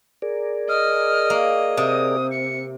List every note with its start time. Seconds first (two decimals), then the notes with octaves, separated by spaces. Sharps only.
0.22 G#4 A#4 D5
0.69 D#5 F6
1.30 A#3
1.77 C3 D#6
2.31 C#7